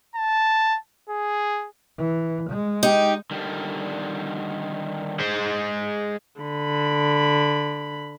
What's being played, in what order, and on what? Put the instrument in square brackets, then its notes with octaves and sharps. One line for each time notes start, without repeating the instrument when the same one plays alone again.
[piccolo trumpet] A5
G#4
[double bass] E3
G#3
[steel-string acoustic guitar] D#4 [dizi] G4
[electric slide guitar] D3 D#3 G3
[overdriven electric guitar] G#3 C5
[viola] D3 B5